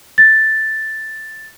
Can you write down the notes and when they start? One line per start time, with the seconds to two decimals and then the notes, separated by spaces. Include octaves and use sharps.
0.18 A6